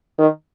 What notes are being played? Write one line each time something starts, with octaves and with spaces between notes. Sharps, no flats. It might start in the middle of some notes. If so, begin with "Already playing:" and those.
D#3